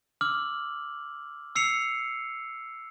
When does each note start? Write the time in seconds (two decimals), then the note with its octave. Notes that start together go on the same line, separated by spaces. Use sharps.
0.21 D6 E6 F6 F#7
1.56 E6 C7 C#7 F7